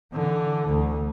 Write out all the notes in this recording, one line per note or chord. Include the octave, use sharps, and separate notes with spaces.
D3 E3
D2